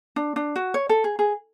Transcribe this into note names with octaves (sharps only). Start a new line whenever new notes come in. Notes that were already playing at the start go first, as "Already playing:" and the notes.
D4
D4
F#4
C#5
A4
G#4
G#4